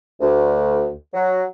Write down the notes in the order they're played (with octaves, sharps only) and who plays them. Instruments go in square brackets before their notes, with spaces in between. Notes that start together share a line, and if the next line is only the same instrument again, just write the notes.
[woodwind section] D2
F#3